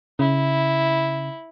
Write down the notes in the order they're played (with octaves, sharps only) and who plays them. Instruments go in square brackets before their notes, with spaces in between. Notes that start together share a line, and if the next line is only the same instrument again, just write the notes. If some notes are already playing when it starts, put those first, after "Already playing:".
[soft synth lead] C#3 [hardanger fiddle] E4